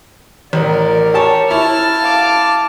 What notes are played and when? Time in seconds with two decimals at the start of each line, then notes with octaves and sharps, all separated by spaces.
0.53 A1 A#4 D5
1.14 G4 C#5 A5
1.51 E4 A5 F6
2.01 F5 D6